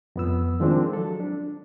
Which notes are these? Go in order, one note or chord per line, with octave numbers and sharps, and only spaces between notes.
F2 B3 E6
D#3 F3 G#3 C4 D4
F#3 A4
D4